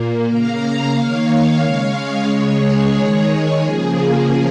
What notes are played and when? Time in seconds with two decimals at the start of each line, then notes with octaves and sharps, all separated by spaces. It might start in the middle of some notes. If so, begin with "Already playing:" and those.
Already playing: A#2 A#3
0.26 C#3 A#3 F5 A#5
0.92 D#3 A#3 C#5 F5
1.60 C#3 G#3 C#5 F5
2.27 C#3 G#3 G#4 C#5
2.94 D#3 G#3
3.62 C#3 F3 A#3 G#4